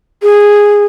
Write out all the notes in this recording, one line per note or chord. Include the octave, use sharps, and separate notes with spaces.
G#4